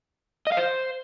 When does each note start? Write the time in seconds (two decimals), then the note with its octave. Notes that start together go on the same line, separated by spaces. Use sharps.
0.47 D#5
0.52 F5
0.57 C5